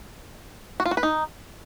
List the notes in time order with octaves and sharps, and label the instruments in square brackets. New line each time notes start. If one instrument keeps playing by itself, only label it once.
[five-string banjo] F#4
F4
F#4
B4
D#4